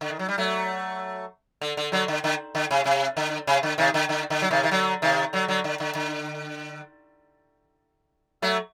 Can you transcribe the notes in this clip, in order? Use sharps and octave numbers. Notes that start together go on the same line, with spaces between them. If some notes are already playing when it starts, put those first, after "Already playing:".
D3
D#3
F#3
G3
F#3 A3
D3
D3
D3 F#3
D3
D3
D3
C3
C3
D3
C3
D3
C3 D#3
D3
D3
D3
F#3
C3 D#3
D#3
D3 F#3
C3 D#3
D3 F#3
D3 F#3
D3
D3
D3
F#3 A3